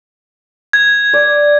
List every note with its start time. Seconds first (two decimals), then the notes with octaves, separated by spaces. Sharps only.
0.73 G#6
1.13 D5